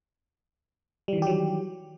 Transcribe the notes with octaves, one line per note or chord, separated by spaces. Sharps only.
D#3 E3 F#3 G3 G4